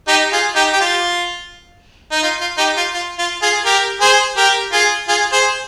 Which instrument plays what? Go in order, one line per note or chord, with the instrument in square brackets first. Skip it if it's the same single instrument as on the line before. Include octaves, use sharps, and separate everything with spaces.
[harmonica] D#4 G4
F4 G#4
D#4 G4
G4
F4
D#4
F4
F4
D#4 G4
F4
F4
F4
F4 G#4
G4 A#4
G#4 C5
G4 A#4
F4 G#4
F4 G#4
G#4 C5